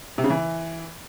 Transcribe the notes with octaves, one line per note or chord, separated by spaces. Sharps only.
C3
C#3
E3